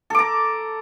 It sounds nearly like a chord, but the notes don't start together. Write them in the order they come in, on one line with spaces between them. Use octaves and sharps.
A4 D6 A#5